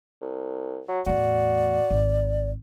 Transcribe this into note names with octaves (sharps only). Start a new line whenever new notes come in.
C2
F#3
E2 A2 F#4 D5
G#1